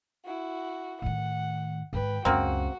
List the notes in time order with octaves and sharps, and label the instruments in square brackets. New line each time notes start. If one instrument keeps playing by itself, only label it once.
[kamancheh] E4 F#4
[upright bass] A2 D#3 [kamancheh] F#5
[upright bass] G#2 D#3 [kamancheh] B4 G5
[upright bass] C#2 F#2 [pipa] A#3 C4 [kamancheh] F#4